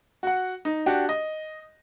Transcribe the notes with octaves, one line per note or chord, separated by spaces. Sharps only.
F#4 F#5
D#4
D4 F#4 G4
D#5